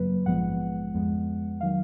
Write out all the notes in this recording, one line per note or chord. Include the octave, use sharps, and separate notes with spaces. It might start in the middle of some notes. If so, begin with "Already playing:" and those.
Already playing: F#2 C#3 F#3 A#3 B4
A#1 G#2 F3 G#3 B3 F#5
F2 F3 G#3 B3
D#3 F#3 F5